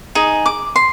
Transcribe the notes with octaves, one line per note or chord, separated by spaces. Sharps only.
D#4 G#4
D6
C6